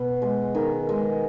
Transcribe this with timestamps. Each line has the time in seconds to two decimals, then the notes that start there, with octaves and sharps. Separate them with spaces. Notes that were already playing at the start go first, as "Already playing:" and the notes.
Already playing: B2 B3
0.22 G#3
0.55 D#3
0.89 G#3